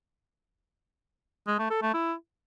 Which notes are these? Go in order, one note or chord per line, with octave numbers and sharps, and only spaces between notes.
G#3
A3
A4
A3
E4